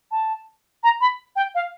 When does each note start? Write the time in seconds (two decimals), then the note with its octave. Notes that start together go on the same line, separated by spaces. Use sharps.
0.11 A5
0.83 A#5
1.01 B5
1.36 G5
1.55 F5